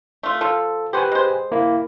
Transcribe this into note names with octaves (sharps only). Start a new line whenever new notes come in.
A3 F4
F3 F4 A4
F#4 G4 B4 C5 G#5
G#3 C5
A#3 E4